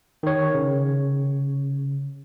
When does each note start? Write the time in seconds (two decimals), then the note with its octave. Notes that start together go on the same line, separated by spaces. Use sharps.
0.23 D#3 C#5
0.54 C#3